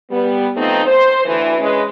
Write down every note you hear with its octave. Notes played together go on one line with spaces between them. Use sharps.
G3 B3
F3 A3 B3 C4 D#4
C5
D2 E3
G#3 C#4 B4